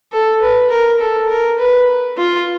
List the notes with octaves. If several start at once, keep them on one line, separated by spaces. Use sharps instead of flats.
A4
B4
A#4
A4
A#4
B4
F4